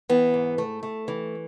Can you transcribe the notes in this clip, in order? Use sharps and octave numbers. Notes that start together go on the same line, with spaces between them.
E3 B3
G#2
A3
A3
E3